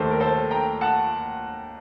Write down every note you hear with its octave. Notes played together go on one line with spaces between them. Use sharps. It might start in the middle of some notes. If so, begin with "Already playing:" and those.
Already playing: D#2 D#3 A3 A4 C5
A#4
A4 C5
G5 A#5
F#5 A5